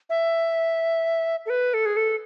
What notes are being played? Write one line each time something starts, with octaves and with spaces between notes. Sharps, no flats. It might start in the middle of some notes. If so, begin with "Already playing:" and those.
E5
A4
B4
A4
G#4
A4